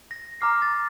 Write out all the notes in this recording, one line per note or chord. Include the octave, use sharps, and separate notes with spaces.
A#6
A#5 D6 F6 C7
A6